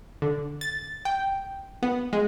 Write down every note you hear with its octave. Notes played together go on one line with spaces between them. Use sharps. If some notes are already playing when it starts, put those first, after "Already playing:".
D3
A6
G5
B3
G#3